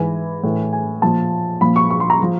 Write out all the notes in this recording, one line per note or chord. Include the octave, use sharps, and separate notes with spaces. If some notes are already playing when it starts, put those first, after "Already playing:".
Already playing: G#2 E3 G#5
A2 E3
G#5
A#2 F3 A5
A#2 F3 B5
C#6
C#6
C6
A#5
F3